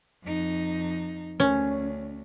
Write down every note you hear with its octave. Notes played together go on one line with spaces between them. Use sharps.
F2 D#4
D2 C#4